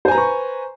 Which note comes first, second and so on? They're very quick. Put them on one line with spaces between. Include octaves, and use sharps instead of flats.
C5 G#5 A#5 B4 C#6